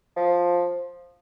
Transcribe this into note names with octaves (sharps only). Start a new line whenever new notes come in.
F3